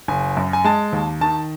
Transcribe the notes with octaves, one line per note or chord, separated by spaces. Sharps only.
F#1 G#5
F#2
G#5
G#3 A5
D#2
D#3 A5